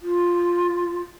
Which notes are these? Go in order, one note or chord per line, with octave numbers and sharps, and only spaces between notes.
F4